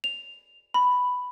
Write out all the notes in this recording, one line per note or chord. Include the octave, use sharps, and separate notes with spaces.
F7
B5